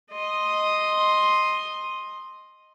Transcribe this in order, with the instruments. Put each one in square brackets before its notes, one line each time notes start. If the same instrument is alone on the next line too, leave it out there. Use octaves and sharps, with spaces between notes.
[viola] D#5 C6